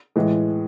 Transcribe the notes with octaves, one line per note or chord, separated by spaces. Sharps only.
A2 E3 G#3